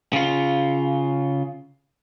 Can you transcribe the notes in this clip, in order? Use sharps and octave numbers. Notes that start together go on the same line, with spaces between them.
C#3 F4